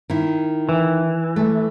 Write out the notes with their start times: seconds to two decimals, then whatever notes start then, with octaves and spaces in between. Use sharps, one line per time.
0.10 D#3 E4
0.69 E3
1.36 A3